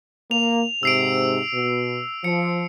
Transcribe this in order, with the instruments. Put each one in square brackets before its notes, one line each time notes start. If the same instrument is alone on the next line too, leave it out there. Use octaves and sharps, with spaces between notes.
[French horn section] A#3 [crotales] F7
[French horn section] G#2 C3 [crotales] E6 C7 D7
[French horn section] B2
[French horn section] F3 [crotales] C#7